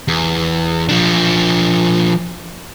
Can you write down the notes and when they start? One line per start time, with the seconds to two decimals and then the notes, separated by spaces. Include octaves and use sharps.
0.08 E2
0.89 F3 D4